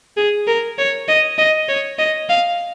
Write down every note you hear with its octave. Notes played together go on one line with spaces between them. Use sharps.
G#4
A#4
C#5
D#5
D#5
C#5
D#5
F5